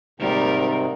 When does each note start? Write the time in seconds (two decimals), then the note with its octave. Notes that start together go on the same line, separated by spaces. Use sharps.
0.20 G#2 C3 D#3 G3 A#4